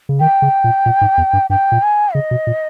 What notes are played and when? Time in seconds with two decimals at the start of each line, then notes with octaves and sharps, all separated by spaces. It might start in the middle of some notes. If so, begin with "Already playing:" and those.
0.09 C#3
0.20 D#3 G5
0.42 C#3
0.64 A#2
0.86 A#2
1.01 G#2
1.18 E2
1.33 G2
1.50 G2 G5
1.72 A#2
1.83 G#5
2.14 C#3 D#5
2.31 B2
2.47 A#2